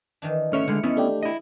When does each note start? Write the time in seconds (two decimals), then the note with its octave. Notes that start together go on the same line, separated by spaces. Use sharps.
0.22 D#3 E3 D4
0.53 A3 C#4 C#5 E5 F6 C#7
0.68 D3 G#3 E4
0.83 G#3 B3 C#4 E4
0.97 A3 D4 G4
1.23 E4 D#5